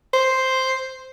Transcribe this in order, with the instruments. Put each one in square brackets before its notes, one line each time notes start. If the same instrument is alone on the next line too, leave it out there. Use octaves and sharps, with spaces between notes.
[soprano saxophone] C5